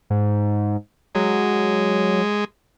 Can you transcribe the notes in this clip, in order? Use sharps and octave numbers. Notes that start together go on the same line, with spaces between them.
G#2
F#3 G#3